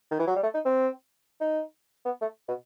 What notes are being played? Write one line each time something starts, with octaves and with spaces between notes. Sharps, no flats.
D#3
E3
F#3
G3
A3
D#4
C4
D#4
B3
A3
B2